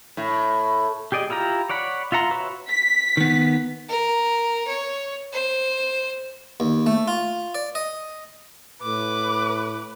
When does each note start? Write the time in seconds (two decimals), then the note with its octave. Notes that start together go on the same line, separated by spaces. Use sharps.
0.17 A2
1.12 G4 G#4 D5 D#5
1.30 E4 F4 G4 A#5
1.69 C#5 D5 F#5 B5
2.12 F4 E5 F#5 A#5 C6
2.31 F#4 B4 C#5 E5
2.68 B6
3.17 D#3 B3
3.89 A#4
4.67 C#5
5.33 C5
6.60 D#2
6.86 A3
7.08 F4
7.55 D5
7.75 D#5
8.82 A2 B4 D6